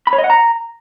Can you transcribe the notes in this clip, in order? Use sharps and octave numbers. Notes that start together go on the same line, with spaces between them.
B5
C#5
D#5
F#5
A#5